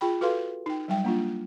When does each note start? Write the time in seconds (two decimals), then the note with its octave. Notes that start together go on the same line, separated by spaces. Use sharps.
0.01 F4 G#4 G5 B5
0.21 F#4 A4 B4 F5 C6
0.66 D#4 G5
0.88 F#3 G3 G5
1.04 A#3 D4 F4